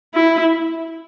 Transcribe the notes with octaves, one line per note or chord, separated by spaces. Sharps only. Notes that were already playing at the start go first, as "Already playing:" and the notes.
E4